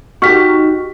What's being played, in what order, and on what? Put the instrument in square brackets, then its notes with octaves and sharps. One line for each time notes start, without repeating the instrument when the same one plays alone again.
[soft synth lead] D#4 [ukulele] F#4 G4 [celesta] C#6 F6 B6